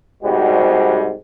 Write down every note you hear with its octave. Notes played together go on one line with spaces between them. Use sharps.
C2 G#2 B2 G3 F#4